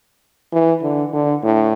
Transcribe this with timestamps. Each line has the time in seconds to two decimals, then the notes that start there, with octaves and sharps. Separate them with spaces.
0.53 E3
0.83 D3
1.13 D3
1.44 A2